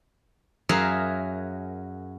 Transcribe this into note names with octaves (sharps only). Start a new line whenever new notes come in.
F#2 F#3 G#4 A#4 E5 F5